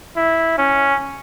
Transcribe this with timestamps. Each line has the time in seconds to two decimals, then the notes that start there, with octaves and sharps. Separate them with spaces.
0.16 E4
0.58 C#4